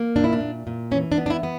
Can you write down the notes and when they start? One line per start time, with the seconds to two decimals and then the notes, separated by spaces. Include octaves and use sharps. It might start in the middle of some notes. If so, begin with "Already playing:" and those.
Already playing: A#3
0.16 A#2 D4
0.24 E4
0.33 D4
0.40 A#2
0.67 A#2
0.91 E3 C#4
1.12 D4
1.18 B3
1.26 D4
1.30 E4
1.43 B3